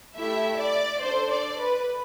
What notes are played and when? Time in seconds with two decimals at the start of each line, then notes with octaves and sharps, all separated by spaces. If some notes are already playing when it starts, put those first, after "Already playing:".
0.16 A3 E4 G4 E5
0.59 D5
1.02 D4 A4 C5
1.32 D5
1.61 B4